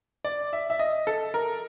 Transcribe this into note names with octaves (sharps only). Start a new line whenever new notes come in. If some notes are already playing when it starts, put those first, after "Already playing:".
D5
E5
E5
D#5
A4
A#4